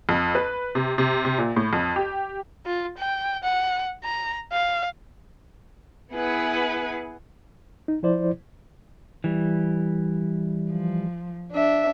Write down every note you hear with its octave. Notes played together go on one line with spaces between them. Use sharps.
F2
B4
C3
C3
C3
A#2
A2
F2
G4
F4
G5
F#5
A#5
F5
B3 E4 G#4 B4 F#5 G#5
D#4
F3 E4 C5 D5
E3 G3
F3
D4 E5